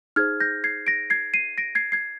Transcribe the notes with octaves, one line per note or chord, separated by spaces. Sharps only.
D#4 G#4 C5 F6 G#6
G6 A#6
G#6 C7
A#6 D7
G#6 C7
C7 D#7
A#6 D7
G#6 C7
G#6 C7